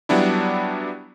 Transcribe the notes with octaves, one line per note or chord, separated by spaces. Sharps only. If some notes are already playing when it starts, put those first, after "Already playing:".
F#3 G3 B3 D4 E4